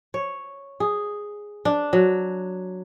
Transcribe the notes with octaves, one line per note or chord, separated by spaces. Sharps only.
C#5
G#4
D4
F#3